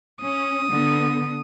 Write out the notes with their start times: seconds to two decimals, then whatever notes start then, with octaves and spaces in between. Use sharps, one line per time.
0.22 C#4 D#6
0.72 D3 B3